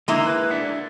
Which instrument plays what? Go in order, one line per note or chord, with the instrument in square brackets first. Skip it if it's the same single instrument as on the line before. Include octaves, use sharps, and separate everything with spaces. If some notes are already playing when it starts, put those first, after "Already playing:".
[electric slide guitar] D3 D#4 [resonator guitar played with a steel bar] G#3 A#3 E4
[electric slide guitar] B4
D4 E5 F#5